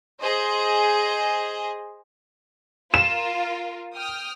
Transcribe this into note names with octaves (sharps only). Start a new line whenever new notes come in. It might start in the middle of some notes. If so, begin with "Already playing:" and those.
G#4 C5 D#5
F4 A#4 E7
G5 D#6 F6